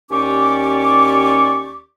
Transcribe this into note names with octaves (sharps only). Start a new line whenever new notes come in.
D#2 C#4 G4 D5 C#6 D6